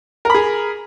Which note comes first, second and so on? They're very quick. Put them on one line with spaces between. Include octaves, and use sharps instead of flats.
A#4 B5 G#4